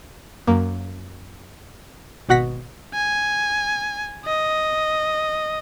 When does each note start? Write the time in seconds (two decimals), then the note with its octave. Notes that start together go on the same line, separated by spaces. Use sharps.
0.47 F#2 A#3
2.29 G#1 B2 F#4 F#5 A#6 B6
2.94 G#5
4.26 D#5